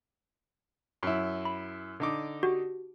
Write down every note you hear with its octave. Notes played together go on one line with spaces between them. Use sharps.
F#2 E4
B5
D3 D#4 D6
F#4 G4